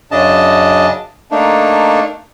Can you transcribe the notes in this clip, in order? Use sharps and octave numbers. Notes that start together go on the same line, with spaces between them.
F#2 C#3 D4 D#5 A5
A3 A#3 D4 D#4